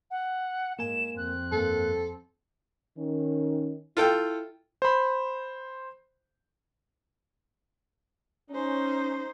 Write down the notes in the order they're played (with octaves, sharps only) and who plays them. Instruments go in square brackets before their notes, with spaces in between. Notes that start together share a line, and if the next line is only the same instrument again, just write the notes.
[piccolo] F#5
[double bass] G#2 [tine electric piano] A#3 A#4 G#5 [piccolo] E7
[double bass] F2 C4 [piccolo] F#6
[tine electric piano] G2 A#3 [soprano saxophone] A4
[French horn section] D#3 C#4
[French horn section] E4 [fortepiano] F4 A4 G5
[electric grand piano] C5 B5
[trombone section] C#4 [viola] D#4 C5